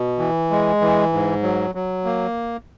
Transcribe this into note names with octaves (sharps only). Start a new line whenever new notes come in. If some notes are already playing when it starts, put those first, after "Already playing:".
Already playing: B2
E3
G#3
E3
G#2
F#3
F#3
A#3